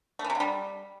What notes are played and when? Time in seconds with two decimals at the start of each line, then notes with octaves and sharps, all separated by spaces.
0.19 A3
0.24 E3
0.30 C3
0.35 D3
0.40 G3